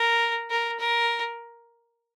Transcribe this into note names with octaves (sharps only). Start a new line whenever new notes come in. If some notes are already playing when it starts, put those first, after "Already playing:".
Already playing: A#4
A#4
A#4